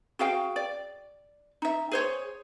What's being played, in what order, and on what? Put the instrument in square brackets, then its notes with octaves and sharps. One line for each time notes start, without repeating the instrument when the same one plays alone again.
[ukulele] F#4 G#4 F5 G5
D5
D#4 E5
G#4 C5 C#5